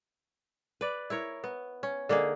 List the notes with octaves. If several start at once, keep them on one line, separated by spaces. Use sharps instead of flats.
B4 D5
E4 A#4 C#5
B3
C#4
D3 A#3 D#4 G#4